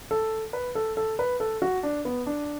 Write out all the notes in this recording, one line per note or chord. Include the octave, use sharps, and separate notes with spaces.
A4
B4
A4
A4
B4
A4
F#4
D4
B3
D4